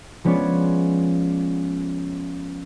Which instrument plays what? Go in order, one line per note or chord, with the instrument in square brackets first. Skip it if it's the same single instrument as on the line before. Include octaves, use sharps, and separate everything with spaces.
[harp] F3 G#3 B3 C#4 C#5 D5